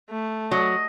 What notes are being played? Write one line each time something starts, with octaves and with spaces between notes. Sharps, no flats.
A3
F#3 D#5